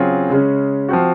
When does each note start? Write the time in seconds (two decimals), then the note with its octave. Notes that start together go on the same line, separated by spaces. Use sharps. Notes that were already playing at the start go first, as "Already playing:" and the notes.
Already playing: C#3 F#3 C4 F4 G#4
0.30 C#3 G#3 C#4
0.89 F3 C4 F#4